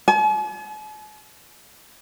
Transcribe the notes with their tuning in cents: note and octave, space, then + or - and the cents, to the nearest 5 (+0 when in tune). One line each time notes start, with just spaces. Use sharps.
G#5 +45